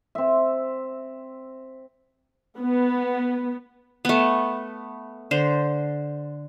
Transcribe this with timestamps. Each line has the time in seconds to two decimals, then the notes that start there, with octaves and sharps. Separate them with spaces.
0.15 C4 E5
2.59 B3
4.05 A3 B3
5.31 D3 C5